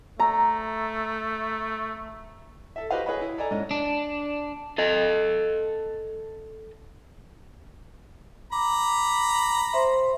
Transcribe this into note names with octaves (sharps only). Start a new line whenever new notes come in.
A3 A#5
A4 E5
F#4 G4 B4 C5 D#5 F5
G#4 B4 C#5 D#5 B5
E4
A4 D5 D#5 G#5 A#5
G#2 C#4 D#5
D4
A4 D#5
A#5 B5 D6
C5 E5 C6